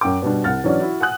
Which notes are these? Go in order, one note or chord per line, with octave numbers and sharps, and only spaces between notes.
F#2 G5 D6
B2 G3 D4
C2 F#5 F6 A6
E3 F#3 C#4 D4 D5
E4 F#4
F#5 G#5 D#6 F#6